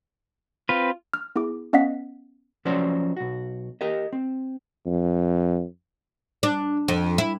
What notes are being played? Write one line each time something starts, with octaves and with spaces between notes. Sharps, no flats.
C4 F4 B4
F6
B3 E4 G#4 D6
B3 C#4 D#5 F5 F#5 B6
F3 F#3 C#4 F#4 C5 D5
B1 F#4
G4 A#4 D#5
C4
F2
D4
F2
E4